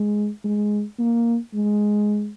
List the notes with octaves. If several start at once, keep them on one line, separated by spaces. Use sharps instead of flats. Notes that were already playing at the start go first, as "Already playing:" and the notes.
Already playing: G#3
G#3
A#3
G#3